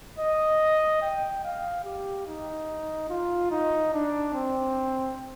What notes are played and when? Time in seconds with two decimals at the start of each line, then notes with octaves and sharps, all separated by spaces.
0.19 D#5
1.02 G5
1.44 F5
1.84 G4
2.26 D#4
3.10 F4
3.51 D#4
3.93 D4
4.33 C4